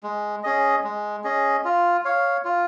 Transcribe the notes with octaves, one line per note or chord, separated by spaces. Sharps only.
G#3
C#4 G#4 D#5
G#3
C#4 G#4 D#5
F4
C#5 F5
F4